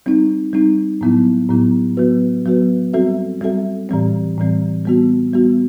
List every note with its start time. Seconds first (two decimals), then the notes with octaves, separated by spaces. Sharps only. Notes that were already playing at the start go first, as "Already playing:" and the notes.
0.06 G3 C4 D#4
0.53 G3 C4 D#4
1.01 A2 F#3 B3 E4
1.50 A2 F#3 B3 E4
1.97 F#3 B3 F#4 B4
2.46 F#3 B3 F#4 B4
2.93 G3 C4 F#4 A4 E5
3.41 G3 C4 F#4 A4 E5
3.89 A2 E3 G3 C4
4.38 A2 E3 G3 C4
4.85 G3 B3 F#4
5.34 G3 B3 F#4